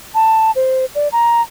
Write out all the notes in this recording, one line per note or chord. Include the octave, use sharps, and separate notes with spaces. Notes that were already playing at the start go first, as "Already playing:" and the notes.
A5
C5
D5
A#5